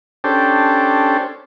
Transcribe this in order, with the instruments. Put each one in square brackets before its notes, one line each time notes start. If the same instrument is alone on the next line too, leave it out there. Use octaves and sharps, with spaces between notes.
[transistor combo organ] C#4 D4 G4 A4 C5